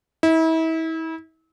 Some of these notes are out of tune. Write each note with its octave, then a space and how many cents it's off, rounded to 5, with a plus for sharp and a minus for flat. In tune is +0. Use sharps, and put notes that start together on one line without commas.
E4 -35